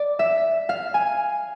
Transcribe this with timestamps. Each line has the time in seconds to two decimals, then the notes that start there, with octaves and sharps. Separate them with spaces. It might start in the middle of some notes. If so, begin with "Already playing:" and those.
Already playing: D5
0.19 E5
0.69 F5
0.94 G#5